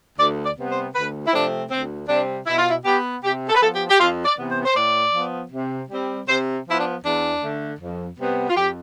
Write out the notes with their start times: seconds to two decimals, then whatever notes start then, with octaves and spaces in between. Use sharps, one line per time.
0.18 D2 D5
0.44 D5
0.57 C3 G3 B3
0.70 C5
0.94 D2 B4
1.27 E4
1.33 C3 F3 A3 C4 D4
1.70 D2 C4
2.09 C3 G3 C4 D4
2.47 B2 E4
2.58 F4
2.69 E4
2.85 B3 G4
3.23 C3 G4
3.49 A4
3.55 B4
3.61 F3 B3 A4
3.75 G4
3.90 G4
3.99 F2 F4
4.25 D5
4.37 C3 E3 B3
4.50 C5
4.65 C5
4.76 A2 D5
5.13 F3 B3
5.51 C3
5.90 G3 C4
6.28 C3 C5
6.66 F3 B3 E4
6.78 D4
7.04 E2 D4
7.42 D3 A3
7.80 F2
8.18 C3 G3 B3
8.49 F4
8.56 F2 G4